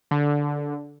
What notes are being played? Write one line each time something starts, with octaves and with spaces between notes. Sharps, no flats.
D3